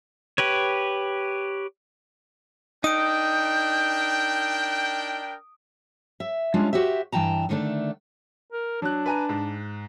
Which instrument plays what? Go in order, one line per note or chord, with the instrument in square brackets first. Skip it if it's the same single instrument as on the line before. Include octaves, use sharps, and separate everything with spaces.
[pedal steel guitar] G4 B4 C#5
[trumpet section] D4 A#4 G5 [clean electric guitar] D#4 [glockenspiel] D#6 D7 [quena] G6
[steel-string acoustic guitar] E5
G3 G#3 C#4 D4 F4
F#4 G4 C5 E5
G2 E3 G5 A5 A#5
D3 D#3 A3 C4 D4
[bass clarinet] A#4
[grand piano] F#3 F#6 [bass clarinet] D4
[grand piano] B4 G#5 A#5
G#2